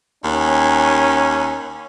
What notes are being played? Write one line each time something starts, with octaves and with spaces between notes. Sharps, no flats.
D#2 C#4